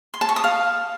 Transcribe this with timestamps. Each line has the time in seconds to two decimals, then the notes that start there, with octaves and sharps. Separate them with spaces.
0.14 C6
0.21 A5
0.29 C#6
0.36 D#6
0.44 F5